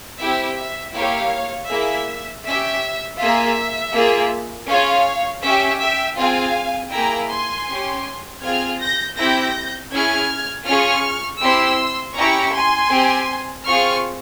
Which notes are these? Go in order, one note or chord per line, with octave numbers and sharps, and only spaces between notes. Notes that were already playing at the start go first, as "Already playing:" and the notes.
C4 E4 G4 E5
E5
A#3 E4 G4 C#5 F5
A#3 E4 G#4 E5
C#4 G4 E5
A#3 F4 G#4 E5
A#3 F4 G#4
C#4 F4 G#4 C#5 F5
C#4 G4 E5
E5 G5
C4 F4 G#4 F5 G#5
A#3 E4 G#4 G5 A#5
G#5 C6
C#4 G4
C4 F4 G#4 F6 G#6
G6 A#6
C4 E4 G4 G6 A#6
C#4 E4 G#4 F6 G#6
C#4 F4 G#4 C#6 F6
C4 E4 G4 C6 E6
C#4 E4 G4 A#5 C#6
G#5 C6
C4 G4
C4 F4 G#4 C#6 F6